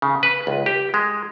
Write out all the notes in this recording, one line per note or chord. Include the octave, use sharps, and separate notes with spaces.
C#3
B4
C#2
G4
G#3